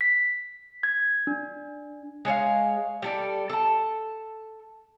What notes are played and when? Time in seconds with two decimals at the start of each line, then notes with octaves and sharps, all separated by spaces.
0.01 B6
0.83 G#6
1.27 D4
2.25 G#3 C#5 D5 F5
3.02 G3 A4 D5
3.49 A4 A5